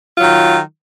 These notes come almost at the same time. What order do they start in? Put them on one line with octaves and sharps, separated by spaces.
F4 F#3 D#3